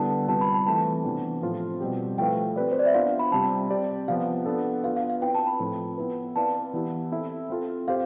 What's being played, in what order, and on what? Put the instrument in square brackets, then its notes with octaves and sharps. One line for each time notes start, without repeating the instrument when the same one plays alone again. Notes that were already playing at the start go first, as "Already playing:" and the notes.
Already playing: [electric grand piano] D3 G3 B3 E4 [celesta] A5
[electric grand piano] C3 G3 C4 F4 B4 [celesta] A5
[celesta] B5
A5
[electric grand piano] E3 A3 C4 [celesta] A5
[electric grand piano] C3 E3 B3 D4
A2 F3 C4 F4 C5
B2 G3 C4 G4
[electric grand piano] F3 A3 E4 B4 F5 [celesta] G5
[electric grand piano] C4 G4 B4 D5
[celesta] C5
D5
E5
[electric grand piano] B3 D4 F4 C5 [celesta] F5
[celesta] B5
[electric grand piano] C3 G3 C4 [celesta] A5
[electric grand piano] C4 G4 D5
[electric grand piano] C3 F3 B3 [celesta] F5
[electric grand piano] B3 D4 A4
[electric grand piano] B3 D4 F4 B4 [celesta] F5
[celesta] F5
F5
[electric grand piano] C4 E4 B4 [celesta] G5
[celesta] A5
B5
[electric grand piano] A2 F3 C4
B3 E4 B4
[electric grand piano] C4 E4 B4 D5 F5 [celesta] A5
[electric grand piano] E3 B3 E4 G4
C4 E4 A4 E5
C4 F4 A4
[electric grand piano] C4 G4 C5 [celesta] F5